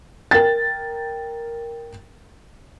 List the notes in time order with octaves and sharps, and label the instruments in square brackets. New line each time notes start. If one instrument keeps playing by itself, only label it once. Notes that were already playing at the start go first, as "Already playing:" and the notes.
[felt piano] A#4 G5 A6